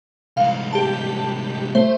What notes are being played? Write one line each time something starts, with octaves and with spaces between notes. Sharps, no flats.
C2 G#2 F5
G4 A5
A3 C5